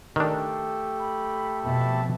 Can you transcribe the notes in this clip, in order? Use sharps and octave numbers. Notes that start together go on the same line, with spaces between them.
D#3 A3 D4 G4 A4
B5
F2 B2 E5 A5 B5